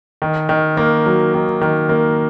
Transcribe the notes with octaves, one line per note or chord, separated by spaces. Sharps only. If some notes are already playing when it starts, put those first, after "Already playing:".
D#3
D#3
A#3
F#3
D#3
D#3
A#3